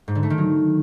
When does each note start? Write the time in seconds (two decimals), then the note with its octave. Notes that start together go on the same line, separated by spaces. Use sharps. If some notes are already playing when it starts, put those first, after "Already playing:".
0.08 G#2
0.15 D3
0.23 A3
0.30 D#3
0.38 F#3